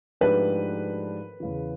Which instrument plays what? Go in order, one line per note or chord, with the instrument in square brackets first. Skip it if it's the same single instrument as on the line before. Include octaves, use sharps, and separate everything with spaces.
[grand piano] G#2 F3 A3 D4 G4 [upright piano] B4
[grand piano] E2 C#3 E3